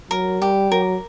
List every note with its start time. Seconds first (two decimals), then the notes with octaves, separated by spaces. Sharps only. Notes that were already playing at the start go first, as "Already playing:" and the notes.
0.11 F#3 A#4
0.41 G3 G4
0.71 F#3 A#4